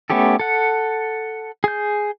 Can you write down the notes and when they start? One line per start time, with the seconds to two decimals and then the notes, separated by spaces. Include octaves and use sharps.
0.10 A3 B3 C#4 G4 A4
0.39 A4 F#5
1.64 G#4 G6